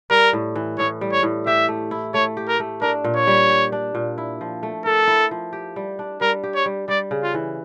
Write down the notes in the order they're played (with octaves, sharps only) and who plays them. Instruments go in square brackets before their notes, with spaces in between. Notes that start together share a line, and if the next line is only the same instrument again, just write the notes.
[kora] G3 [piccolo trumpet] A#4
[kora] A2
E3
[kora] A2 [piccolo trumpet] C#5
[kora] G3
[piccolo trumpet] C#5
[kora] A2
[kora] G4 [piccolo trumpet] E5
[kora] A3
E4
[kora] A3 [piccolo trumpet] C#5
[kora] G4
[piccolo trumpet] A#4
[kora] A3
[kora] D4 [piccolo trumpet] A#4
[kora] A#2
[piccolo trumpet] C#5
[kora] G3
G4
D4
A#2
E4
F3
A3
[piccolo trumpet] A4 [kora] A#4
[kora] E4
F3
G4
G3
D4
[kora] G3 [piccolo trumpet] A#4
[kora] G4
[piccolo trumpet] C#5
[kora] G3
[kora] G3 [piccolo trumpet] D5
[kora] C#3
[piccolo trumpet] F4
[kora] E3